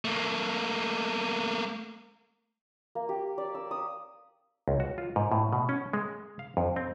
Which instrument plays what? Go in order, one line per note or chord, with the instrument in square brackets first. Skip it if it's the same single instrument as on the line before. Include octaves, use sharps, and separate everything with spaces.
[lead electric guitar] A3 A#3
[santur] A#3
G4
D5
E6
D#6
[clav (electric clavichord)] C#2
F#4
F4
G#2
A2
B2
C#4
G#3
F5
F2
C4